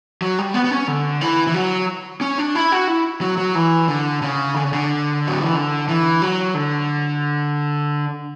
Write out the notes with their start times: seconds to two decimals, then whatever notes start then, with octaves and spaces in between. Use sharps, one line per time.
0.22 F#3
0.39 G3
0.54 B3
0.64 B3
0.71 C#4
0.88 D3
1.21 E3
1.47 E3
1.54 F#3
2.21 C#4
2.38 D4
2.55 E4
2.72 F#4
2.88 E4
3.21 F#3
3.37 F#3
3.55 E3
3.88 D3
4.22 C#3
4.54 D3
4.64 C#3
4.73 D3
5.27 F#3
5.41 E3
5.55 D3
5.89 E3
6.22 F#3
6.54 D3